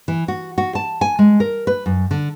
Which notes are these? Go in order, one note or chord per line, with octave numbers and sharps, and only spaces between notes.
E3
F#4
F#4
A5
G#5
G#3
A#4
B4
F#2
D3